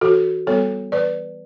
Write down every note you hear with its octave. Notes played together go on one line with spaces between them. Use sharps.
E3 F#4 A4
G3 B3 A4 C#5
E3 B4 D5